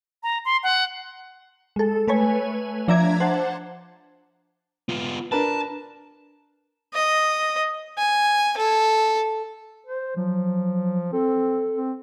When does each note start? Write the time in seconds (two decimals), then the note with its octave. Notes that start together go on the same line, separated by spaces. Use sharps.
0.23 A#5
0.45 C6
0.63 F#5
1.76 G#3 A4
2.08 A3 B4 C#5 G#5
2.88 F3 D4 E5 A#5 D6 G#6
3.20 C5 F#5 A5
4.89 B3 F4
5.32 D4 A#4 B4 A5
6.94 D#5
7.98 G#5
8.58 A4
9.86 C5
10.16 F3 F#3
11.13 C4 A4
11.76 C4